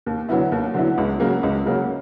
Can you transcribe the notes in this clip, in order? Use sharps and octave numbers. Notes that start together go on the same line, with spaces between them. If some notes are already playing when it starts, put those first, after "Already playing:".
D#2
D3 F#3 B3 E4
D#2
D3 F#3 B3 E4
C#2
C#3 F#3 A#3
C#2
C#3 F#3 A#3